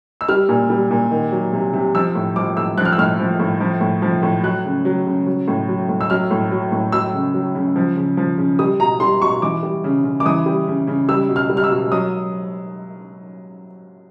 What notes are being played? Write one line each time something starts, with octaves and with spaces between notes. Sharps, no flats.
E6
G3 F6
A#2
G3
A#2
D#3
F#3
C3
C3
F3 E6
A2
F3 D6
A2 E6
F3 F#6
F6
E6
A2 F6
F3
A2
F3
A2
F3
A2
F#3 F#6
C#3
F#3
C#3
F#3
A2
F#3
A2
E6
F#3 F6
A2
F#3
A2
F#3 E6
C#3
F#3
C#3
F3
C#3
F3
C#3
G3 D#6
B2 A#5
G3 C6
B2 C#6
E3 D6
G3
C#3
C#3
D6
E3 D#6
G3
C#3
C#3
G3 E6
B2
F6
G3
F6
E6
B2
F#3 D#6